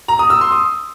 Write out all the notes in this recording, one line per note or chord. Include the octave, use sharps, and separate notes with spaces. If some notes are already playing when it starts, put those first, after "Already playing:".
A#5
D#6
E6
C6
D#6